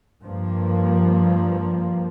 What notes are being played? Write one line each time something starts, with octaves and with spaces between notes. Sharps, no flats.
G2 F3 A#3